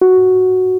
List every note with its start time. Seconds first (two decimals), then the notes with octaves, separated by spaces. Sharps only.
0.01 F#4